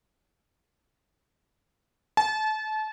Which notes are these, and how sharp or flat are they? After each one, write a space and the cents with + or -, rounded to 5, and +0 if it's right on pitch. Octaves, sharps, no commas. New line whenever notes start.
A5 -30